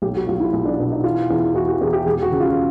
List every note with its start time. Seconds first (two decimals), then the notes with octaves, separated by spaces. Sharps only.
0.02 B1 G4
0.15 F#4
0.27 B1 F4
0.40 E4
0.53 B1
0.65 D4
0.78 B2 D4
0.92 D#4
1.04 E3 F4
1.30 E2
1.54 E3 F#4
1.68 G4
1.81 E2 G#4
1.93 G4
2.05 E1 G#4
2.23 F#4
2.32 C#3
2.40 F4